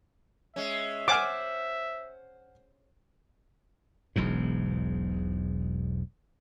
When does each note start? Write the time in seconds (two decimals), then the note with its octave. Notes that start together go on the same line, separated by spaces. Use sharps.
0.56 G#3 C#4 E5
1.08 C5 F#5 G#5 D6 F6
4.16 E1 B1 E2 G#2